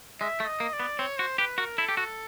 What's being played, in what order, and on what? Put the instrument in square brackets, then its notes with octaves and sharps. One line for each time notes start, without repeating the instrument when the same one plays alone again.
[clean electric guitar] G#3 [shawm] E5
[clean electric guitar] A3
[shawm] D#5
[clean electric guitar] A#3
[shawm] D5
[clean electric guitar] B3
[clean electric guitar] C4 [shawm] C#5
[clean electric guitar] F#4 [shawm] C5
[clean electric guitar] G4 [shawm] B4
[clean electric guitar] F#4 [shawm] A#4
[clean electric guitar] E4 [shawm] A4
[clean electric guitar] G4
F#4